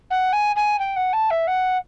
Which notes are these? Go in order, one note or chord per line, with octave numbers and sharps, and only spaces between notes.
F#5
G#5
G#5
G5
F#5
A5
E5
F#5